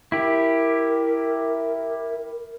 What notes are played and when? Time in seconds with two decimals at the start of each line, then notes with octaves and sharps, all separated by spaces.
0.12 E4 G4 A#4